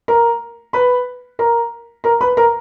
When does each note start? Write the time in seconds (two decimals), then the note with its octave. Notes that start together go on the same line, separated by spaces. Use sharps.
0.08 A#4 A#5
0.73 B4 B5
1.39 A#4 A#5
2.04 A#4 A#5
2.21 B4 B5
2.37 A#4 A#5